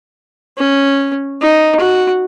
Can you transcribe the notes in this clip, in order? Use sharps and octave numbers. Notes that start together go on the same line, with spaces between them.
C#4
D#4
F#4